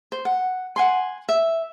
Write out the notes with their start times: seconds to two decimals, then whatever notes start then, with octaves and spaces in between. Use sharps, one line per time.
0.12 C5
0.25 F#5
0.76 F#5 G#5 C6
1.29 E5